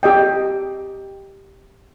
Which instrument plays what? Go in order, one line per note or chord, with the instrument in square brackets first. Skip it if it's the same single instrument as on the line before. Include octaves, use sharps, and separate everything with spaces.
[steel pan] G4 D#5 G5